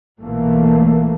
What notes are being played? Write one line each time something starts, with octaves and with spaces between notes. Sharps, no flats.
B1 A#2 E3 A3 A#3